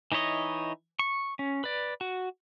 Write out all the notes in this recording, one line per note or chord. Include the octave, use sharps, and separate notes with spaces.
E3 D#4 E4 C#5 D#5
C#6
C#4
B4 D5
F#4